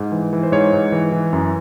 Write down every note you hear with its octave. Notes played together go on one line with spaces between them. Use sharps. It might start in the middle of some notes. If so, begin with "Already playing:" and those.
Already playing: G#2
E3
E3
C5
G#2 C#5
G#2
E3
E3
F#2